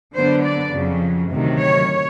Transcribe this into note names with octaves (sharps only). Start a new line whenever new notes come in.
D3 F#3 B3 D4 C5
D5
F2 C#3 F#3
D2 C3 D#3 F#3
C#5